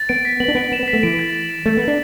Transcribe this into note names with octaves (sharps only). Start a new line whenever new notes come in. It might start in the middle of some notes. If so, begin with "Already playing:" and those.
Already playing: A6
B3 D7
B6
B3 F#7
D4
B3 D7
B3 E7
B3
B6
A3
E3 D7
A6
F#7
D7
A3 A6
B3 F#7
D4